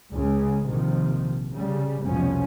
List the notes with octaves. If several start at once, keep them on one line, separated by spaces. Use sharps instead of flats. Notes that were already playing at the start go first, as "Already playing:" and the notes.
C#2 C#3 G#3
A#1 C3 D#3 F3
C#3 G3
F1 C2 B2 F3 C#4